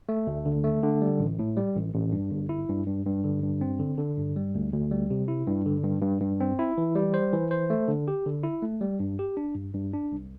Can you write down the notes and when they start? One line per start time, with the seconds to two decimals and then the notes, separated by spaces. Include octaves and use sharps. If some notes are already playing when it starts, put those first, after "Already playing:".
0.09 A3
0.27 D2
0.46 D3
0.64 A3
0.83 D3
1.02 G3
1.19 A1
1.39 A2
1.57 G3
1.76 A1
1.94 A1
2.12 G2
2.31 G1
2.49 E4
2.69 G2
2.86 G2
3.06 G2
3.24 D3
3.42 G2
3.61 C4
3.79 D3
3.98 D3
4.17 G2
4.36 G3
4.55 D2
4.73 D2
4.91 G3
5.10 C3
5.28 E4
5.47 G2
5.66 D3
5.84 G2
6.02 G2
6.21 G2
6.40 C4
6.59 E4
6.78 E3
6.95 G3
7.14 C5
7.33 E3
7.51 C5
7.70 A3
7.88 D3
8.08 G4
8.26 D3
8.44 E4
8.62 A3
8.81 G3
9.00 G2
9.19 G4
9.37 D4
9.55 G2
9.74 G2
9.93 D4
10.12 C2